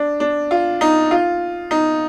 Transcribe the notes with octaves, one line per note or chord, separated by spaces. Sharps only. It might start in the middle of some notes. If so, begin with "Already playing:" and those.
Already playing: D4
D4
F4
D#4
F4
D#4